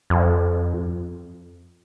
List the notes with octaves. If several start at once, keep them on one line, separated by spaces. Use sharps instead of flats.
F2